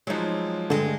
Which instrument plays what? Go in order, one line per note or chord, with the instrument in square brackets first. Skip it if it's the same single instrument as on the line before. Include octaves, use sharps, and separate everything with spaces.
[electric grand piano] F3 G#3 [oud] F#3 D#4
[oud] G2 G#3 [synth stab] D3